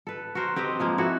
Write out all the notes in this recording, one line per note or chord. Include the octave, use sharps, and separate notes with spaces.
A4 B4
F#4 A4 A#4 C5
C4 G4 B4 D#5
F3 G#3 A#3
E4 F#4 A4